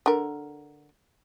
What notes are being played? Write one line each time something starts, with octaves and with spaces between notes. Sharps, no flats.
D3 A#4